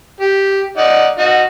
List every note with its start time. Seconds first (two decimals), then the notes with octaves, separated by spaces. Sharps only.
0.20 G4
0.77 D#4 D5 F#5
1.19 D#4 F#4